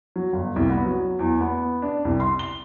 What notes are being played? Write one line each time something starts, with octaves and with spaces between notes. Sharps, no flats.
F#3
G1
C2
B3
F#3
E2
B3
D4
C2
C6
G7